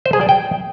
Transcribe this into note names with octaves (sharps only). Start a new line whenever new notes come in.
C5
G#4
D5
G5